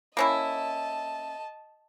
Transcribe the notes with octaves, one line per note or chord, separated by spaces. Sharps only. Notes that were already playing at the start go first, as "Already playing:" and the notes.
A#3 C#4 E4 D#5 A5